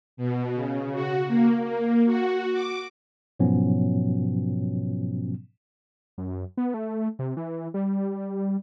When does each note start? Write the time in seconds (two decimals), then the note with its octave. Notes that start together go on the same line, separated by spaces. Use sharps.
0.17 B2
0.55 C#3
0.93 F#4
1.28 A#3
1.63 A#3
2.06 F#4
2.53 D6
3.40 G#2 B2 F3 F#3 B3 C#4
6.18 F#2
6.57 B3
6.74 A3
7.19 C3
7.37 E3
7.74 G3